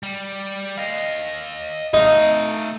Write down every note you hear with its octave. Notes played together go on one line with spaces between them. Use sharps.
G3
D#5 F5
A3 D#4 F5